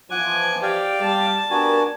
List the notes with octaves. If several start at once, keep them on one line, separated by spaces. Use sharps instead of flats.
E3 F3 F#5 G#5 D6 F#6
G4 D5 F5 G5
G3 A5
B3 D4 F#4 G4 A#4 G#5